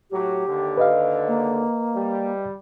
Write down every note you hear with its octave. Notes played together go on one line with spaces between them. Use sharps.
A2 F#3 G4
D#2 D3
B4 D#5 F5
A#3
G3